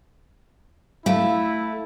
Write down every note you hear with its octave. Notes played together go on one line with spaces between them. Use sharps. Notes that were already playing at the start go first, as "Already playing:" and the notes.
A3 E4 F5